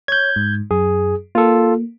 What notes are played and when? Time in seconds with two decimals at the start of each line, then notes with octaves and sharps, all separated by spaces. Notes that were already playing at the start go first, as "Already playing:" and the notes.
0.08 C#5 G6 G#6
0.36 G#2
0.71 F#2 G#4
1.35 A#3 F4 A4